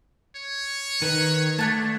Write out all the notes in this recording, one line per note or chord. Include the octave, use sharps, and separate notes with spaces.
C#5
D#3 B4
A3 D4 F#5 A5